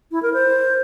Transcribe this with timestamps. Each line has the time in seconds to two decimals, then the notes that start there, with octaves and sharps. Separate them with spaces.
0.11 E4
0.22 A#4
0.33 C5